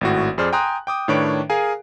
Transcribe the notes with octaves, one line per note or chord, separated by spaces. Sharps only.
G#1 A2 F#4
F2 G#4 C5 D5 F6
G5 G#5 A#5 C6 D#6 F#6
G5 D6 D#6
A2 D#3 D4 B4 C#5 D7
G#4 A#4 F5 G#5